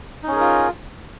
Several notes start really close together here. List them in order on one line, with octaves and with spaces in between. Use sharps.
D#4 C#4 G#4 A#4 F4